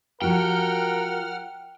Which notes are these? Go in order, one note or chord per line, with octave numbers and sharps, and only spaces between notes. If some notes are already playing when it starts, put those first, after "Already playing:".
F3 F#4 G4 A#4 F#5 G5 F6